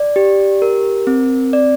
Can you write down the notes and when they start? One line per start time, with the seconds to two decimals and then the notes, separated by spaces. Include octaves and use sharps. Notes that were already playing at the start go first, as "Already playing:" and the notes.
Already playing: D5
0.16 G4
0.62 A#4
1.07 C4
1.53 D5